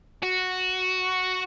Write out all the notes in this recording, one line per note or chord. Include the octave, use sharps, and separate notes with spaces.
F#4